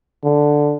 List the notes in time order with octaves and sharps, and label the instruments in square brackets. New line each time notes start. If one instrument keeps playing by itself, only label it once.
[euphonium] D3